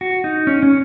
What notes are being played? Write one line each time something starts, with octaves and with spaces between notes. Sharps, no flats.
F#4
D#4
C#4
C#4